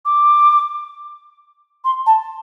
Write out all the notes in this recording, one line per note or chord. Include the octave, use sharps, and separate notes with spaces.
D6
C6
A5